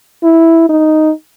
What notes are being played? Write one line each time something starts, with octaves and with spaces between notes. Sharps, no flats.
E4
D#4